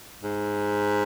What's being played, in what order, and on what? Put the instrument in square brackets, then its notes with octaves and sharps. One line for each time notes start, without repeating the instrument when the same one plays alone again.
[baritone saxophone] G#2